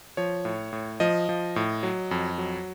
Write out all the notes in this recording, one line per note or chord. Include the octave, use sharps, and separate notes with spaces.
F3 C#5
A2
A2
F3 D#5
F3
A2
F#3
F2
F#3